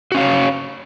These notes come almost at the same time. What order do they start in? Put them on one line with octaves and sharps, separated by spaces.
F#4 C#4 F5 C#5